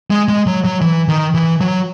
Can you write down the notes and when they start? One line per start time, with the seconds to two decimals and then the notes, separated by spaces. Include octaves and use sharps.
0.10 G#3
0.28 G#3
0.47 F#3
0.65 F#3
0.81 E3
1.08 D#3
1.34 E3
1.61 F#3